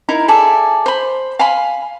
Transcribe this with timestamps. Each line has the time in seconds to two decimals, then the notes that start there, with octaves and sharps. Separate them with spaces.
0.09 D#4 E4 A#4
0.28 G#4 A4 D5 E5
0.86 C5 B5
1.39 F5 G#5 B5 C6